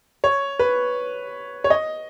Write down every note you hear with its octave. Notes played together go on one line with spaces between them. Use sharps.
C#5
B4
C#5
D#5